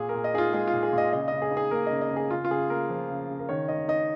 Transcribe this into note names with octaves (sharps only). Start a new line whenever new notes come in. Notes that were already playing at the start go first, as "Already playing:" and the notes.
Already playing: A#2 G#4
A#4
A#2
D#5
D#4 F4 G#4
G#3 G#4
F4
A#2
G#4
A#2 D#5
C#3 D#5
C#3 D#5
G#4
D#4
G#4
A#3 A#4
C#3 D#5
D#5
C#3
G#4
C#3 F4
F4
C#3 G#4
A#3 A#4
F3
C#3
C#3
A#4
D#3 C#5
D#3 D#5
D#4 D#5